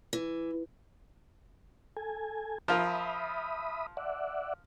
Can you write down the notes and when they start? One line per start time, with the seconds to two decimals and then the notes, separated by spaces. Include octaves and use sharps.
0.13 E3
1.97 A4 G#5
2.68 F3 F4 A#4 E5 B5 D#6
3.97 D5 E5 F#5